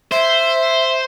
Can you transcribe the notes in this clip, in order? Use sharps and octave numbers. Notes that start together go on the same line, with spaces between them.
C5 E5